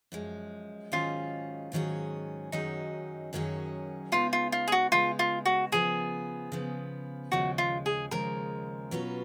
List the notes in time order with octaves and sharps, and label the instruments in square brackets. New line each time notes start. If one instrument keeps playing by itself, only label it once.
[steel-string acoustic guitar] F#2 F3 G#3
[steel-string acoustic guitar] G#2 D#3 F#3 C#4 G#4 [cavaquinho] F4
[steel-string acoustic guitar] G#2 D#3 F#3 C#4 G#4
[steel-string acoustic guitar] F#2 D#3 F#3 C#4 G#4 [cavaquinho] D#4
[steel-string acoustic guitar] F#2 D#3 F#3 C#4 G#4
[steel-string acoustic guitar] C#3 G#3 B3 D#4 [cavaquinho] F4
[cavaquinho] F4
F4
G#4
F#4
[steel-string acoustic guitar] C#3 G#3 B3 D#4 [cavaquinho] F4
[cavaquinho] F4
F#4
[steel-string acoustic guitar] C#3 F3 B3 [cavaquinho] G#4
[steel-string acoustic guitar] C#3 F3 B3
[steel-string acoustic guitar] D#2 C#3 F3 G#3 [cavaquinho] F#4
[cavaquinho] F4
G#4
[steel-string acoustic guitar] D#2 C#3 F3 G#3 [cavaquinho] A#4
[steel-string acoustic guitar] B2 F#3 C#4 F4 B4